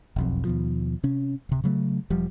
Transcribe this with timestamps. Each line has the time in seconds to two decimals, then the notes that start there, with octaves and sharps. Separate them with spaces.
0.16 E1 B1 F2
0.45 D#2 B2 F3
1.03 C3 C#4
1.49 D1 C3
1.64 C#3 F#3 A3
2.10 E1 F3 G3